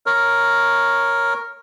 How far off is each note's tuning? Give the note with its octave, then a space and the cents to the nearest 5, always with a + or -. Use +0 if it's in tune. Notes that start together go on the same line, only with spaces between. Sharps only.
A#4 +0 C#5 -5